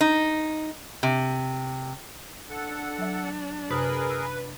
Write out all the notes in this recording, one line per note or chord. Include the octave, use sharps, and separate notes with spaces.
D#4
C3
D4 A4 F#5
F#3 E5
F#2 C3 G#4 A#4 B4 D#6
E6